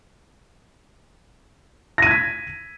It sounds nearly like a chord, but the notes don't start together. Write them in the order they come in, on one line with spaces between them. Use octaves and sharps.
A#6 D#7 G#6 B6